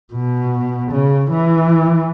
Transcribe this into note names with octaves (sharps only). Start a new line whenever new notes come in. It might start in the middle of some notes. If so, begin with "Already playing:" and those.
B2
C#3
E3